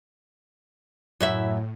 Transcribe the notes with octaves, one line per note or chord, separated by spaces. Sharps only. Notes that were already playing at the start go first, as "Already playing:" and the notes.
F#2 A2 E4 E5